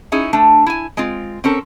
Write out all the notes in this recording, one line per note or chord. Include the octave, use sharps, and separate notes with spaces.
C#4 D#4 E4 G#4
A3 D4
E4 G#5
G#3 C4 F4
C4 C#4 A4 A#4